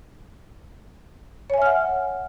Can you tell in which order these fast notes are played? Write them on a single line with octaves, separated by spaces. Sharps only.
C#5 G#5 E5 F6 F#5